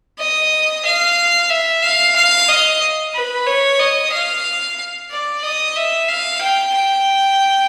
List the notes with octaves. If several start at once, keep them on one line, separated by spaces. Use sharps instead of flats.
D#5
F5
E5
F5
F5
D#5
B4
C#5
D#5
F5
D5
D#5
E5
F5
G5
G5